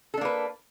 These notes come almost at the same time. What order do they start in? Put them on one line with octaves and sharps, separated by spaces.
A4 D4 A#3 B4